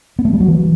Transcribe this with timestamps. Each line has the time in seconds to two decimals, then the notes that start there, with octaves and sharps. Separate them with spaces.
0.19 B3
0.25 A3
0.33 G3
0.40 F#3
0.48 E3